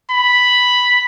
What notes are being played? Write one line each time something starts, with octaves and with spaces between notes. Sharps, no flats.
B5